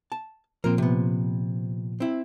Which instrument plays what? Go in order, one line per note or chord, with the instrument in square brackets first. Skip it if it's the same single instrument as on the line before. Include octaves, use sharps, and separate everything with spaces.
[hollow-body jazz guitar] A5
[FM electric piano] A#2 F3 [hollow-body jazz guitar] C4 A#4
[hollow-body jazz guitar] C3 B3
C4 E4